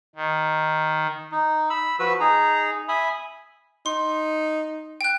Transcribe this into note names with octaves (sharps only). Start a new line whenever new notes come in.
D#3
D#4
B5 E6
F3 F#4 B4 E6
D#4 G#4 A#5
E5 G#5 B5 D#6
D#4 C6
G5 F#6